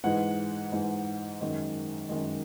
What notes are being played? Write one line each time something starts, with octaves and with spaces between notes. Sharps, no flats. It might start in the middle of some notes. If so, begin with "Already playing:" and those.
G#2 E3 G#3 F#5
G#2 E3 G#3
F#2 D#3 G#3
F#2 D#3 G#3